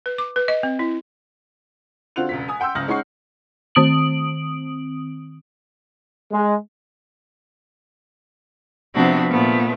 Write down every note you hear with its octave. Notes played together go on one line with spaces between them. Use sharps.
B4
D6
B4
D#5
C4
E4
D3 C4 F4 F#4 F#6 F7
E1 C#2 B6
G#5 D#6
F#5 G5 C6 E6 G6
F#1 C#2 D#6 F6 A#6 F#7
G#3 C#4 D#4 F#5 C#6 C7
D#3 C4 D#6 D7 F#7
G#3
C3 F3 B3 C4 D4 F#4
A#2 F3 A3 B3